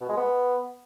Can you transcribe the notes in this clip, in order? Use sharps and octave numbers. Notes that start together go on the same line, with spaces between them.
B2
G#3
B3